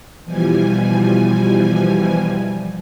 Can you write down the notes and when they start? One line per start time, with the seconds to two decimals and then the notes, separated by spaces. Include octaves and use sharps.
0.23 B2 E3 F3 G3 G#5